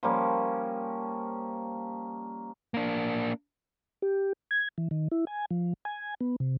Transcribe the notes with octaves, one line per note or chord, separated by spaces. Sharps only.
F3 G3 A#3 C#4
A#3 D4
G4
G#6
E3
D#3
E4
G#5
F3
G#5
B3
C3